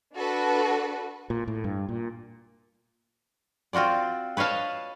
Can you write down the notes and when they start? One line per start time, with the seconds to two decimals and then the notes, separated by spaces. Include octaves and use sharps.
0.15 D4 F#4 A4 B4
1.30 A#2
1.48 A2
1.64 G2
1.89 A#2
3.73 C4 F4 F#4 C5 D5
4.37 B4 C#5 D#5 F5 A5